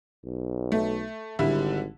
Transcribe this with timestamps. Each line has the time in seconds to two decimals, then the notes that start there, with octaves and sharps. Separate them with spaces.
0.25 B1
0.72 A3
1.39 G#1 D3 G3 E4